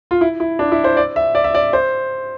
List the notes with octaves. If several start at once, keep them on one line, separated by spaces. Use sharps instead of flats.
F4
E4
E4
D4
E4
C5
D5
E5
D5
E5
D5
C5